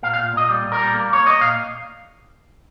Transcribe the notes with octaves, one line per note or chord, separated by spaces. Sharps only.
A#2 F5
F5
A#2
A#2 D#5
G3
A#2
A#4
G3
A#3
A#3 C#5
A#3 D#5
A#2 F5